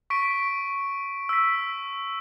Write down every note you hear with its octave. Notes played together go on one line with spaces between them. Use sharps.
C#6 B6 D7
E6 B6